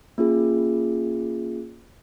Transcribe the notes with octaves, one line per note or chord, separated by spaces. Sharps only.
A#3 C#4 F4 G#4